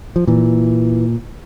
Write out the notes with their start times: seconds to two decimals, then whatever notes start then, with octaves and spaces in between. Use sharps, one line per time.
0.16 F3
0.27 A#2 E3